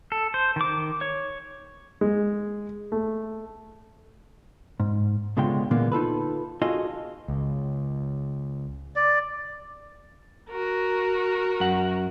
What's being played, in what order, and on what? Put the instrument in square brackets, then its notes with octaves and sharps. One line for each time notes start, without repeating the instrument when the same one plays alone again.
[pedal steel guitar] A4
C5
D#3 D6
C#5
[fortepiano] G#3
A3
[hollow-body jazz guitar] G#2
C#2 B2 D3 G#3 F4 G5
A#2 D3 E3 G#3 A#3 B3
D#4 F4 A4 B4
F4 F#4 G#4 A4 D#5
[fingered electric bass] C#2
[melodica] D5
[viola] F#4 A#4
[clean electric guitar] F#2 F#5